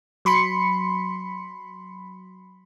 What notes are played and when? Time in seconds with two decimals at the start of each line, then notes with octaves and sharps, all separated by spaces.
0.25 F#3 B5 C6 C#7